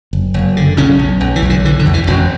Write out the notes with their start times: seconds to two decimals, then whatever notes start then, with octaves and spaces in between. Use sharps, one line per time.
0.13 F#1
0.34 F#1
0.57 D3
0.77 B1 C#3 C#4
0.99 B1
1.20 B1
1.36 E3
1.42 B1
1.50 D3
1.65 D3 E3
1.79 D3
1.85 E2
1.94 E3
2.07 E1 F#2 F#3